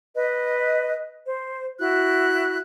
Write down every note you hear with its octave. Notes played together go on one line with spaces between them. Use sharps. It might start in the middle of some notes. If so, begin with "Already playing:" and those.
B4 D#5
C5
E4 F#4 F#6